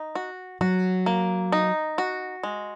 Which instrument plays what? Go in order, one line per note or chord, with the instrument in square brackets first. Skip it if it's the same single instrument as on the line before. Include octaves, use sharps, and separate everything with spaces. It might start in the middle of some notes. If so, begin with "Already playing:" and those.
Already playing: [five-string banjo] D#4
F#4
[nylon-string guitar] F#3 [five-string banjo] F#4
[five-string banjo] A#3
D#4
F#4
G#3